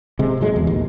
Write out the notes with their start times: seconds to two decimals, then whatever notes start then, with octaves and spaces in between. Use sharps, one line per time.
0.19 C3 G#3
0.41 G#2 F#3 G#3 A3
0.53 E2 G#3
0.67 A#1 D#2